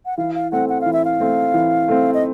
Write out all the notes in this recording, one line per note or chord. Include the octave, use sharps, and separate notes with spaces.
F#5
E3 F5
F5
A3 C4 F#5
F#5
F5
E3
E5
F5
A3 C4
E3
A3 C4
D#5